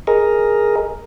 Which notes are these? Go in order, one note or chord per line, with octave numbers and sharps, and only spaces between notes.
G#4 A#4 D#5